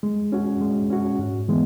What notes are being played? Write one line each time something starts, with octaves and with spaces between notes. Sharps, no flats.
G#3
C#4 F#4
G#3
C#4 F#4
G#2
E3 G#3 B3